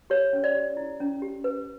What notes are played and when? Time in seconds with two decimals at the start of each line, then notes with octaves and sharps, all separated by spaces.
0.10 G4 C#5
0.33 C#4
0.44 D5
0.55 G4
0.77 E4
1.00 C#4
1.22 G4
1.44 B4